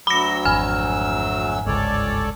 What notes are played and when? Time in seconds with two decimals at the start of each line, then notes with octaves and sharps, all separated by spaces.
0.07 D2 F#3 B5 E6 A#6
0.45 G#1 F2 G#5 F6
1.66 G1 C#2 G#2 A4 C#5 D5